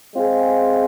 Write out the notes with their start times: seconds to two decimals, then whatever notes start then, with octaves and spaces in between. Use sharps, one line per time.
0.15 G#3 C4 F4 G#4